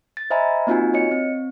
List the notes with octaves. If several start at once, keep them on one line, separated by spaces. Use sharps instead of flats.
A6
C5 D#5 E5 G#5 A#5 B5
A#3 C4 D#4 F4 F#4 G#5
C#5 D#5 C#7
C4